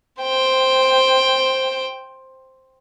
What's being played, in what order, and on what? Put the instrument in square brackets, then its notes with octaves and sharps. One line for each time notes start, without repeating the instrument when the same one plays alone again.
[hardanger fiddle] C5 G5